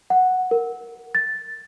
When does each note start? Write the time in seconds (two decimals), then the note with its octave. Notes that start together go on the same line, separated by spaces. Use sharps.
0.10 F#5
0.51 A#4
1.15 A6